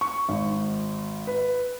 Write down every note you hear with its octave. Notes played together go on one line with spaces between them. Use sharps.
C#6
G#1
B4